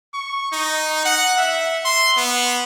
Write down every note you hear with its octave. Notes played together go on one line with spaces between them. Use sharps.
C#6
D#4
F#5
E5
C6
B3